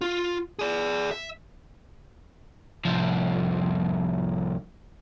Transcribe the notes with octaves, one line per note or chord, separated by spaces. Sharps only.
F4
G#4 D5
E5
C2 F3